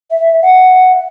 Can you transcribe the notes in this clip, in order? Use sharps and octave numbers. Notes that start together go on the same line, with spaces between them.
E5
F#5